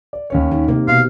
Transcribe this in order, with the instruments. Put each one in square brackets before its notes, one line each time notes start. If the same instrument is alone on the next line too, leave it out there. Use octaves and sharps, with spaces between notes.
[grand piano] D5
D#2 C#4 C#5
[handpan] D#3
[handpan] C3 [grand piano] A#3
[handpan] B2 [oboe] F5